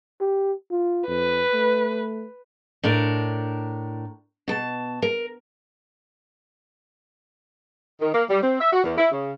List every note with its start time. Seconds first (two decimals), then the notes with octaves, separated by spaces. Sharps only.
0.21 G4
0.71 F4
1.07 F2 B4
1.53 A3
2.84 A2 D4 A#4
4.48 B2 A5
5.02 A#4
8.01 D#3
8.14 A#3
8.30 G3
8.43 C4
8.61 E5
8.73 F#4
8.84 E2
8.98 E4
9.12 C#3